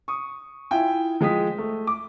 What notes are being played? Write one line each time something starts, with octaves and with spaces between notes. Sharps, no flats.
C#6 D#6
E4 F4 E5 G5 G#5
F3 G#3 G5 D#6 B6
A3
D6